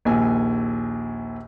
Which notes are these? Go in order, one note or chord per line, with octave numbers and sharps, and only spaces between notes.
A#1 D#2 G#5